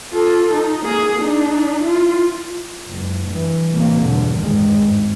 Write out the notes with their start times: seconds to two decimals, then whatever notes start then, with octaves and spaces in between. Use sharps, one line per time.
0.13 F4 A4
0.53 D#4
0.85 A#3 G#4
1.21 D4 D#4
1.81 E4 F4
2.91 F#1 C#2
3.28 G2 E3
3.72 A1 C3 E3 A#3
4.03 G1 E2 B2 D3
4.36 A1 E2 G2 D#3 G#3
4.71 G#1